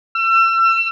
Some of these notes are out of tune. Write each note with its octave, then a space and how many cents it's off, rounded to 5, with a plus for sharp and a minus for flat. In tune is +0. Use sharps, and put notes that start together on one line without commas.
E6 +35